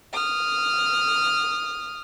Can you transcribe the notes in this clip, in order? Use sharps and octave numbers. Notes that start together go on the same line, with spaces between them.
D#6 F6